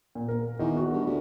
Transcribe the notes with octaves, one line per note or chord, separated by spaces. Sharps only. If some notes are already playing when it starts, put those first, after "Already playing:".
A#2
A#4
E2 D#3
F#4
G2
D2